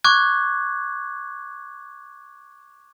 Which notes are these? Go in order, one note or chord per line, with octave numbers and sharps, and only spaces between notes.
C#6 D6 F#6 G#6